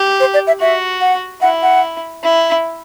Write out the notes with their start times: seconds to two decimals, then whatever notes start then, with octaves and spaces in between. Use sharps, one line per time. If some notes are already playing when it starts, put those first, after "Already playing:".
Already playing: G4
0.20 C5
0.34 D5
0.47 E5
0.60 F#4 E5
1.01 F#5
1.42 E4 F#5
1.63 F#5
2.24 E4